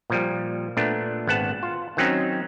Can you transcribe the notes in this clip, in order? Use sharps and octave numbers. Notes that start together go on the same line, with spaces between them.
A#2 F3 G3
A#2 A3 B3 D4
G#1 B3 F#5 A5
F4
D#3 F#3 C4 C#4 D#4